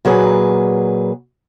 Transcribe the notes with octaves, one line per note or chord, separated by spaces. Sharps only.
A#2 F#3 G#4 B4